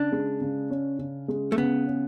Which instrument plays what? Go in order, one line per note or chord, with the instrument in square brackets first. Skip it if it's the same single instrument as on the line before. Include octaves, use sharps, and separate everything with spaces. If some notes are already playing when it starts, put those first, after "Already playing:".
Already playing: [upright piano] C#3 [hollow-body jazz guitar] D4
[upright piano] G#3
C#3
C#4
C#3
G#3
[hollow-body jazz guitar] A3
[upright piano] C#3 [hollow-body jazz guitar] B3
[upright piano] C#4